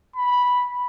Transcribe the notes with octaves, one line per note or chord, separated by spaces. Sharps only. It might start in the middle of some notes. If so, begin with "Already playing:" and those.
B5